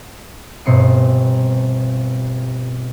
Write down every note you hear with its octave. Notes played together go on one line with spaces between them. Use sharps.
G1 B2 C4 C7 C#7 D#7